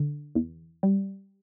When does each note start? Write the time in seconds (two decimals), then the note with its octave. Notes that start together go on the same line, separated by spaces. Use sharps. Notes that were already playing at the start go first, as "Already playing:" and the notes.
Already playing: D3
0.35 E2
0.83 G3